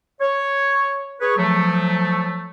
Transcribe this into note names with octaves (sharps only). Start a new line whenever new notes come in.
C#5
G#4 B4 C#5
F3 F#3 A3